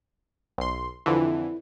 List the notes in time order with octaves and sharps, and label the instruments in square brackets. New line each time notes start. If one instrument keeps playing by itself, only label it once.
[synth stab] B1 C6
[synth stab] F2 D3 E3 [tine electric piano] E4